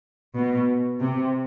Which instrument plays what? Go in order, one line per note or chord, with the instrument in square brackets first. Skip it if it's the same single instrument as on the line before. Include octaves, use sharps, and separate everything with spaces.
[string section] B2
C3